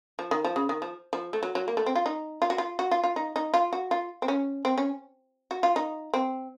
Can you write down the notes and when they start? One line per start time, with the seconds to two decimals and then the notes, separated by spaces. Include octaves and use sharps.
0.19 F3
0.31 D#3
0.45 F3
0.56 C#3
0.69 D#3
0.82 F3
1.13 F3
1.33 A3
1.43 F#3
1.55 F#3
1.68 A#3
1.77 A3
1.86 C4
1.95 F4
2.06 D#4
2.42 F4
2.50 F#4
2.58 F4
2.79 F#4
2.91 F4
3.04 F4
3.16 D#4
3.36 D#4
3.54 F4
3.73 F#4
3.91 F4
4.22 C4
4.28 C#4
4.65 C4
4.78 C#4
5.51 F#4
5.63 F4
5.76 D#4
6.14 C4